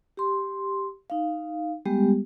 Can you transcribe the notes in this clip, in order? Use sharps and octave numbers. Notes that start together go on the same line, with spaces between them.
G4 C6
D#4 F5
G3 G#3 B3 G4